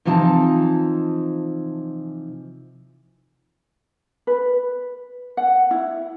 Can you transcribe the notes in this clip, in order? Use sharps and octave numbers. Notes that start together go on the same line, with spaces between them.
C3 E3 F3 D#4 G#5 A5
B4
F#5
E4